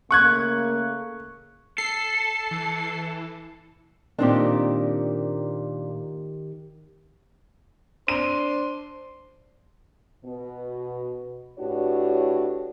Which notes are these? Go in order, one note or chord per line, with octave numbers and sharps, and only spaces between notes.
C#3 A3 A#3 C#6 F#6 G#6
A4 C7
E3
A#2 D#3 C4 D4 G4
D4 C5 C6 D#7
B2
A2 D4 F#4 G4 B4 C#5